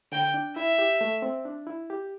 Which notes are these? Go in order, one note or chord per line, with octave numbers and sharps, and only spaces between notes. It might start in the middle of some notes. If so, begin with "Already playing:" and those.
D3 G5
D4
E4 E5
G4
A3
C4
D4
E4
G4